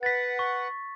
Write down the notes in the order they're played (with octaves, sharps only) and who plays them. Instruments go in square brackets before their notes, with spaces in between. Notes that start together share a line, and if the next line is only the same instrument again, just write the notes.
[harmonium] B4 F#5 [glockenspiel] A6 B6
[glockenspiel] C#6